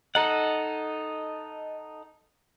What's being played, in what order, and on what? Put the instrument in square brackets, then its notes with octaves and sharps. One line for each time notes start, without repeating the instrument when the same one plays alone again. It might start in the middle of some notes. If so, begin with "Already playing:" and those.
[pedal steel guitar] D#4 A4 F#5 [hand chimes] D#5 A#5